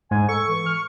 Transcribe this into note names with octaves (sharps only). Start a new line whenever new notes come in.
G#2 G#5
A4 C#6
E3
F6